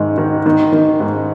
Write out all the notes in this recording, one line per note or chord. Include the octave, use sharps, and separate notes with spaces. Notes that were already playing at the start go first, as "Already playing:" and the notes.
Already playing: G#2 D#3
D#3
D#3
D#3
G#2